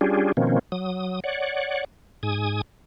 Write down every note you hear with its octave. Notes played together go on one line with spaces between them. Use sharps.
G3 C#4 D4 F4 G4 G#4
B2 D#3 F3 A#3 C4 C#4
F#3 D#6
C#5 D5 F#5
G#2 G#5 D#6